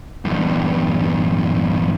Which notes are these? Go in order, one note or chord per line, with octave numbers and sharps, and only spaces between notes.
E2 G2